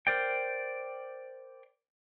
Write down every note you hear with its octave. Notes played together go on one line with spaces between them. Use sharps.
A#4 C5 D5 G5